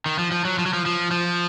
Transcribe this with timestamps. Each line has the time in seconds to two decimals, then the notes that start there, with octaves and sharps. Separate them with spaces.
0.06 D#3
0.19 F3
0.31 F3
0.45 F#3
0.58 F3
0.66 F#3
0.73 F3
0.86 F3
1.11 F3